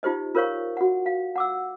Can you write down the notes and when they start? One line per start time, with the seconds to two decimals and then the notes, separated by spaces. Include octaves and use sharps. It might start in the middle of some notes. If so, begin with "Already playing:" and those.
0.03 D#4 F4 G4 C5 D#5
0.35 F4 A#4 C5 C#5 F5 C#6
0.77 F#4 F#5
1.06 F5
1.36 F#5 D6 E6